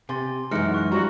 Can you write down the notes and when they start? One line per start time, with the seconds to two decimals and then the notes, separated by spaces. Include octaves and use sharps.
0.09 C3 G#5 C6 A6
0.51 F#2 E3 G#3 D#4 F6 A#6 C#7
0.74 C#6 F#6 C#7
0.92 F3 G3 F#4 A#5